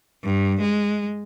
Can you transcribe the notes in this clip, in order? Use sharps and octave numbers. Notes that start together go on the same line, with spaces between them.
G2
G#3